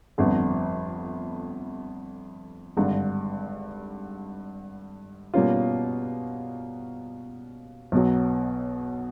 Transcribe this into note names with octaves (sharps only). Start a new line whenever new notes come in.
G1 F2 D3
G#1 G2 D3
B2 G3 A#3 C#4 F4
B1 B2 F#3